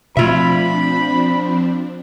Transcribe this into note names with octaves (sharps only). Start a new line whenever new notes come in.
B2 F3 A3 C4 D4 F4 E5 B5